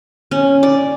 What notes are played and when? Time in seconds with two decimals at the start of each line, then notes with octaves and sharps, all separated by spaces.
0.31 C#4
0.63 D5